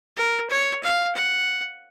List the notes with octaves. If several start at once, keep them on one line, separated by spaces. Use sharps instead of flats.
A#4
C#5
F5
F#5